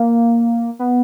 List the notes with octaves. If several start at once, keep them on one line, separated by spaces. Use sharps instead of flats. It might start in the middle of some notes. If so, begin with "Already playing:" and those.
Already playing: A#3
B3